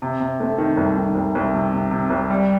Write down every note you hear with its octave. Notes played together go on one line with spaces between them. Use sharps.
C3
C3
A3
D#3
C2
D#3
C2
C2
C3
C3
C3
C2
G3